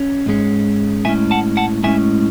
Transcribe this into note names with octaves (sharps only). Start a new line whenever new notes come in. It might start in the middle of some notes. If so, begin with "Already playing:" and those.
Already playing: C#4
G#2 G#3 C#4
A2 G#3 C#4 E5 G#5
F#5 A5
F#5 A5
A2 G#3 C#4 E5 G#5